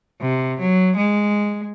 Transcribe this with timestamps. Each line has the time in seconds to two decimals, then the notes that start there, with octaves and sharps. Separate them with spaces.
0.21 C3
0.59 F#3
0.96 G#3